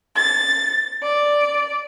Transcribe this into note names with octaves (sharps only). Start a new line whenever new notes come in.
A6
D5